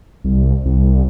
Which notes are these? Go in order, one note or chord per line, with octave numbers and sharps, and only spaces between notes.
C2
C2